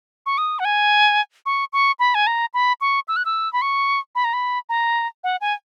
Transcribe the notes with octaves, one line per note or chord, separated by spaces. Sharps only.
C#6
D#6
F#5
G#5
C#6
C#6
B5
G#5
A#5
B5
C#6
E6
F#6
E6
B5
C#6
B5
A#5
B5
A#5
F#5
G#5